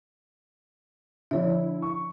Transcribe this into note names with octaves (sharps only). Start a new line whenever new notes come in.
D3 F3 E4 C#5 E5
C#6